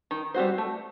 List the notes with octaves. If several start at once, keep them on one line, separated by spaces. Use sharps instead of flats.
D#3
G3 C4 F#4 C5
A3